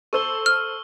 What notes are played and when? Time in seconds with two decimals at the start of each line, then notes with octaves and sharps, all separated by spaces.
0.13 A4 C5 C#6 E6 G7
0.46 F6